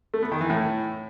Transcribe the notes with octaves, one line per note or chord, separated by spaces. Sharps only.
A3
B3
D#3
E3
A2